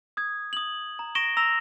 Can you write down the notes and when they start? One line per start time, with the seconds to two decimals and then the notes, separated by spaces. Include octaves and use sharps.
0.17 D#6 G#6
0.53 D#6 F#7
0.99 A#5
1.15 C#6 A#6 D7 E7 G7
1.37 A#5 E6 A#6 F7